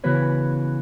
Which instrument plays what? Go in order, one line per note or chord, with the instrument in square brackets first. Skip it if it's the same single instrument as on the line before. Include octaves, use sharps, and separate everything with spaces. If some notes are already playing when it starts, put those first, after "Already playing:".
[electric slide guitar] C#3 E3 B3 F#4 B4 C#5